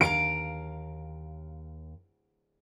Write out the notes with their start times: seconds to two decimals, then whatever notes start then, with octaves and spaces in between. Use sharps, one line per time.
0.01 D#2 F5 A#5 D7